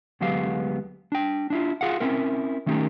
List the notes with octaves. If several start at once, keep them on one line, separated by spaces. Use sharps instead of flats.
D2 F#3 G#3 B3 G4 F5
D4 G5
D4 E4 F4
F4 G#4 F5 F#5
C4 C#4 E4 A#4
D#3 A3 C#4 D#4 G4 A#4